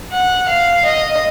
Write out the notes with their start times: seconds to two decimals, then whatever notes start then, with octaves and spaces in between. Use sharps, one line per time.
0.12 F#5
0.48 F5
0.85 D#5